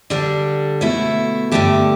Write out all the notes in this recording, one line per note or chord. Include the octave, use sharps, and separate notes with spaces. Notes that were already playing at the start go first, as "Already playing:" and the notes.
D3 G3 D4
B2 A3 E4
G2 D3 A3 G4